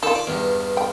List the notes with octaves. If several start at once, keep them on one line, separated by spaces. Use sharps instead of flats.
D#3 F4 A4
D5
E2 G2
G5